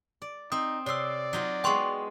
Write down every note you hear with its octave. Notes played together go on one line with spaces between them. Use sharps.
D5
C4 D#4 D#6
C3 C#5 D5 C6 D#6 E6
F#3 D#4 F4
G#3 B3 G5 C6 C#6